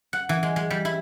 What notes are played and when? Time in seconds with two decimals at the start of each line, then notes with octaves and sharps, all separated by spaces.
0.13 F#5
0.29 E3
0.43 G#3
0.56 G#3
0.70 G3
0.85 E4